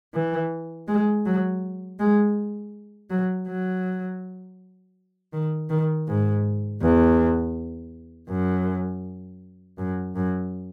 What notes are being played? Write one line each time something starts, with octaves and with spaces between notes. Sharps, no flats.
E3
G#3
F#3
G#3
F#3
F#3
D#3
D#3
G#2
E2
F#2
F#2
F#2